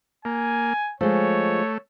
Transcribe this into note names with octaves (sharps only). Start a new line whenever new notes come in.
A#3 G#5
F3 G#3 A3 C#5